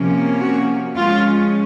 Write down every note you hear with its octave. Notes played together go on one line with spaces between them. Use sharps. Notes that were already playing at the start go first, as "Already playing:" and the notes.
Already playing: C3 F3 A#3 C#4
F#4
F3 G#3 C#4 F4